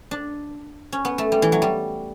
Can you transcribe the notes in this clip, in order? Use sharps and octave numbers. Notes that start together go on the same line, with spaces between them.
D4
C#4
B3
A3
G3
E3
F#3
G3